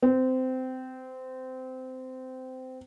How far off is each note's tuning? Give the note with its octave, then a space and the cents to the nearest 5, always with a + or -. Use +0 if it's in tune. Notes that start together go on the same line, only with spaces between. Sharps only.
C4 -20